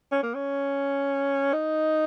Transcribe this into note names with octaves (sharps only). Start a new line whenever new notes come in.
C#4
A#3
C#4
D#4